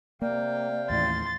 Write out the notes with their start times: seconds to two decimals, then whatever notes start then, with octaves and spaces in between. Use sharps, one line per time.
0.22 C3 A#3 D5 F5 G5
0.90 D#2 A2 E3 C6 A6